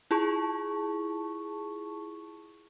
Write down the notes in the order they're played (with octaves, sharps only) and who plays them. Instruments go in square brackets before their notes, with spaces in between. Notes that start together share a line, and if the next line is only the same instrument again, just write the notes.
[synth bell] E4 F4 G#4 A5 C#6